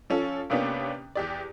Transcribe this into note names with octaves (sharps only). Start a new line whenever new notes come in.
F3 C#4 A4
C3 A#3 B3 C#4 D4 G4
E2 G4 D5